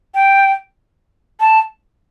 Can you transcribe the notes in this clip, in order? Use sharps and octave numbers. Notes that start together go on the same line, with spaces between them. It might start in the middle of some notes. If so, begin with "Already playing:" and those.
G5
A5